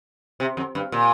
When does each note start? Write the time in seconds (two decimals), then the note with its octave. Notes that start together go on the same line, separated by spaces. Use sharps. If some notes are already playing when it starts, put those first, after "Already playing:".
0.40 C3
0.57 F2
0.75 G2
0.92 A#2